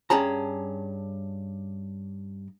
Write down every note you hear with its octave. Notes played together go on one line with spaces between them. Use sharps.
G2 C#4 G#4 A5 A#5